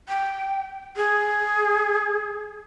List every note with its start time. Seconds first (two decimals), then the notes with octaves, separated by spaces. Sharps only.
0.09 G5
0.96 G#4